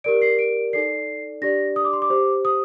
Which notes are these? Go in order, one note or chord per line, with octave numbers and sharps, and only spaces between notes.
G4 A#4 D5 D7
C7
D7
D#4 A4 D5 C7
D4 G4 D5 A#6
D#6
D6
C6
D6
G4 C5
D#6